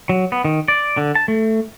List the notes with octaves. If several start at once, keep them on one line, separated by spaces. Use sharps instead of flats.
F#3
B3
D#3
D5
D3
A5
A3